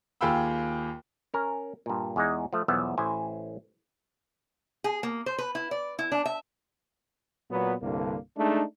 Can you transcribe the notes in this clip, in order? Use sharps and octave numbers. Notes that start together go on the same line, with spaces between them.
D#2 F4 G#4 G5 B5 E6
C#4 A#4
G2 A#2
E2 G#3 D#4
F3 A3
B1 E2 F3 B3 E5
A1 E4 C5 G#5
G#4
A#3
C5
B4
E4
D5
E4
D4
E5
A#2 F#3 B3
C2 G2 D3 A#3
G#3 A3 D4 D#4